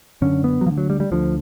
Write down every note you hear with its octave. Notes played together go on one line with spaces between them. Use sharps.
F#2 D3 C#4
B3
F#3
D2 D3 F3
F#3
G3
G3
D2 D3 F3